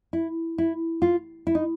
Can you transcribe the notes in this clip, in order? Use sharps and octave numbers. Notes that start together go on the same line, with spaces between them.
E4
E4
F4
E4
D#4